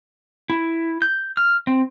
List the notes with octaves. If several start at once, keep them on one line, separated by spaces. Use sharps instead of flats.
E4
G6
F6
C4